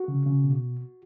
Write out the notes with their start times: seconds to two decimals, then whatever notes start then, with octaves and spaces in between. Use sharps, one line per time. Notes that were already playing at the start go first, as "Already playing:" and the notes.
Already playing: F#4
0.08 C#3
0.26 C#3
0.44 B2